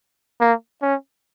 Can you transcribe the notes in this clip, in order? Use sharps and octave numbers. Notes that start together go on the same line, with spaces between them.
A#3
C#4